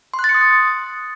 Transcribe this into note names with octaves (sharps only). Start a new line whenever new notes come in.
C6
F#6
A6
C#7
D#6